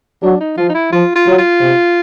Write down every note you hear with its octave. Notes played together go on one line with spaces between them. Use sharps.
F#3 D4
D#4
F3 F4
D#4
E4
F3 F4
F4
F#3
F4
C3